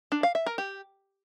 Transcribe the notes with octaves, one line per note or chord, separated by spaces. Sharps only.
D4
F5
E5
A#4
G4